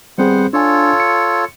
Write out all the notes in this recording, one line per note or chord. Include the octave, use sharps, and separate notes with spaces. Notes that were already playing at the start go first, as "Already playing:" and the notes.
G3 B3 C4 G#4 C5 F#5
D4 F4 A4 C#5 G#5
C#7